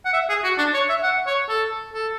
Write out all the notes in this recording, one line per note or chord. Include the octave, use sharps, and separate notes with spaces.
F#5
E5
G#4
F#4
D4
C#5
E5
F#5
C#5
A4
A4